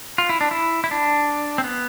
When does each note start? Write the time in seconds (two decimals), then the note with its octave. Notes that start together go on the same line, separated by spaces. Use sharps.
0.18 F4
0.29 E4
0.41 D4
0.51 E4
0.84 E4
0.91 D4
1.58 C4
1.64 B3